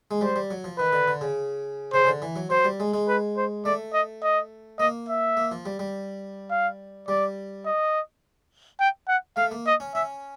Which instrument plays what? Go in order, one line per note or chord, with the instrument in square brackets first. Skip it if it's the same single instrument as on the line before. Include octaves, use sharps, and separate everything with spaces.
[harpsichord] G#3
[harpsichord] G3 [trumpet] C5
[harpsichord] G3
F#3
F3
[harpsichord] D#3 [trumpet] B4
[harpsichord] D3
D3
C#3
[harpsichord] C#3 [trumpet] C5
[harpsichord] C#3
D3
E3
F#3
[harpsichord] F#3 [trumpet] C5
[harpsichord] G3
G#3
G#3
[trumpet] B4
C5
[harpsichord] A3 [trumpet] D5
[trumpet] D#5
D#5
[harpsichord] A#3 [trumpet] D#5
[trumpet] E5
[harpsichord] A#3
F3
G3
G3
[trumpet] F5
[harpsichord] G3 [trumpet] D5
[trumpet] D#5
G5
F#5
[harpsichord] A3 [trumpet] F5
[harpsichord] A#3
[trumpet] D#5
[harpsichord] C#4
[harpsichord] C#4 [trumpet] E5